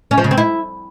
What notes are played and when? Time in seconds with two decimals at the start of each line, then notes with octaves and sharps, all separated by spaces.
0.11 C#4
0.18 F3
0.24 C#3
0.31 C4
0.38 E4